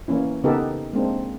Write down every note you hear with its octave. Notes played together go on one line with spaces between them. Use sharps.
E3 A#3 C#4 E4
C#3 B3 D#4 G4 A4 A#4
G#3 A#3 C4 D4